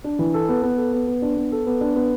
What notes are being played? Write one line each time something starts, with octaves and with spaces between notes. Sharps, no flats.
D4
E3
A4
B3
B3
A4
B3
B3
D4
B3
A4
B3
D4
B3